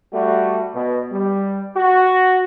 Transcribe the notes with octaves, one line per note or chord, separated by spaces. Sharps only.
G3 A3 F#4
B2
G3
F#4